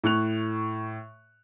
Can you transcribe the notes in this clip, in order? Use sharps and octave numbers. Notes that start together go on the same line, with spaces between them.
A2 C#6 F#6 F7